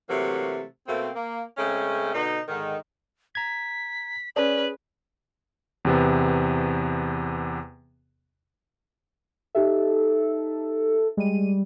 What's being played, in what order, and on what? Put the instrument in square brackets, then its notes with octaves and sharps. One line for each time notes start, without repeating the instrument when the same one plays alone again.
[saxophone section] C3 E3 F#3 A3 A#3
B2 A3 A#3 C4
A#3
C#3 G#3 A3 C4 C#4
B2 D3 D#4
G#2 D3 D#3
[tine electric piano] A#5 G#6 [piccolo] B6
[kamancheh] C#4 B4 [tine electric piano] G#4 [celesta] D5 [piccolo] F#7
[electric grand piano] E2 C3 B3
[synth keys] D#4 G4 E5 [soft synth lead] A4
[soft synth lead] G3 [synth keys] G#3 D#7